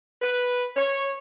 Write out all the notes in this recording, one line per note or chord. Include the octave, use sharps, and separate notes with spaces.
B4
C#5